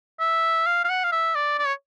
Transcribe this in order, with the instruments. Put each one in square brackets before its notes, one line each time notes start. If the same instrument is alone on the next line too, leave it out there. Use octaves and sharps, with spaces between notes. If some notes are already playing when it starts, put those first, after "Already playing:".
[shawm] E5
F5
F5
F#5
F5
E5
D5
D5
C#5